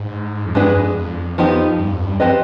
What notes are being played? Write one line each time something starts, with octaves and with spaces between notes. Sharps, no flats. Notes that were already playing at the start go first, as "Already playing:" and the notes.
Already playing: G#2
F2
G2 G#3 D4 G#4 B4
F2
F2
F3 B3 D#4 G4
G2
F2
G2
F3 C4 G4 B4 D#5